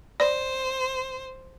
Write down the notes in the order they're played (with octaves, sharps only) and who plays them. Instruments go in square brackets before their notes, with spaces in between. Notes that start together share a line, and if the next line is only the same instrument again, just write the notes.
[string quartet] C5 [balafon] D5